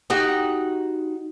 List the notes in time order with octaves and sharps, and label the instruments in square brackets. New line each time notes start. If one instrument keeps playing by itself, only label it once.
[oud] D#4 F#4 G4